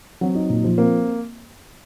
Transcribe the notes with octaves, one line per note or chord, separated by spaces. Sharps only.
F#3 C4
D#4
A#2
F3
A#3 C4